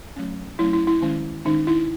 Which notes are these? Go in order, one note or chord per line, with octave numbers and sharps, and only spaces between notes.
F#3 A3 C#4
F#3 A3 C#4 E4
E4
E4
D#3 G#3 C#4
D#3 G#3 C#4 D#4
E4